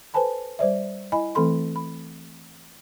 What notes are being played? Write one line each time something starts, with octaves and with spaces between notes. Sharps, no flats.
A4 B4 C5 G#5 A5 B5
G3 C5 D5 E5
E4 D#5 G#5 B5
E3 A3 C4 A4 B5 C6
B5